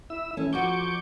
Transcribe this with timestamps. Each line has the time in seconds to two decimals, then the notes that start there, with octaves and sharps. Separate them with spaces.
0.10 E4 E6
0.37 E3 A3 C#4
0.53 F2 F3 F#4 C#6 D6 G6